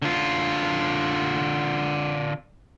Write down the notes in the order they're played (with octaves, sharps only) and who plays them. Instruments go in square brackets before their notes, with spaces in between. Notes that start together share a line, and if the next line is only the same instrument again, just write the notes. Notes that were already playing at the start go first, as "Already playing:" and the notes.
[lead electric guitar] D3 F4